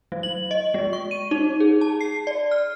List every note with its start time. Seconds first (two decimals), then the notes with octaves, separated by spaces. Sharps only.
0.12 F#3
0.23 F#7
0.51 D#5
0.74 G#3
0.93 C#6
1.11 D#7
1.31 D#4
1.60 G#4
1.81 A5
2.01 C7
2.27 D5
2.51 F6